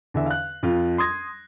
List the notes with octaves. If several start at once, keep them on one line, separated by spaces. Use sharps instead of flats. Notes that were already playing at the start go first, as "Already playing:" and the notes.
E2 D3 E5
F5 F#6
F2 F4
C6 D#6 G#6 A#6